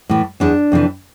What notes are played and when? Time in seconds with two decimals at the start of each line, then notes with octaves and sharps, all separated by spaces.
0.09 A2 E3
0.40 E2 E3 D4
0.72 F2 C3 E3